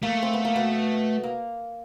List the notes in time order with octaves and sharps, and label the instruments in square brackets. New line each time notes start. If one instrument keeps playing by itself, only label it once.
[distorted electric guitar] A3 [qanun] A#3
[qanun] C4
B3
A#3
B2 B3
A#3